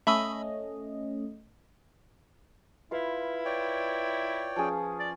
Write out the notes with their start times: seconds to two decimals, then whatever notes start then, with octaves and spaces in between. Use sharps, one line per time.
0.07 A3 C#4 D#5 E5 B5 E6
2.91 E4 F4 B4 F5
3.45 C#5 D5 G5
4.56 F3 C#4 G#4
5.00 D5